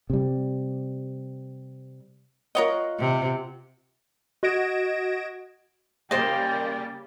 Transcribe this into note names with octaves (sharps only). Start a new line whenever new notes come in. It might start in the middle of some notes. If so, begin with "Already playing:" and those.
C3 G3
F4 A#4 C#5 D#5 F#5
C3
F#4 D#5 G#6 A#6 D7 E7
C#3 G3 A#3 C5 D5 D#5 G5